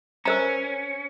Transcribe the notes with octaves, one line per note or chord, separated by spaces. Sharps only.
C#4 A#4 C5 A#5